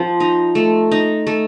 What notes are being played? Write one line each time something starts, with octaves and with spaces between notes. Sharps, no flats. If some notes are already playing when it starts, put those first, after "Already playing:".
Already playing: F3 C4
D#4
A3
D#4
A3